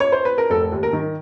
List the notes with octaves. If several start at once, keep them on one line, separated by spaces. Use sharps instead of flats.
C#5
C5
B4
A#4
F1 A4
D#2
A#4
D#3